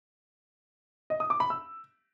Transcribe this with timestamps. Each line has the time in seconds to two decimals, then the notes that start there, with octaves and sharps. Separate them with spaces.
1.10 D#5
1.20 D#6
1.30 D6
1.40 B5
1.50 E6